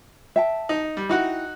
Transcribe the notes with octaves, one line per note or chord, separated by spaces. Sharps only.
E5 G5 A5
D#4
G3
D#4 E4 F#4 F#5 G5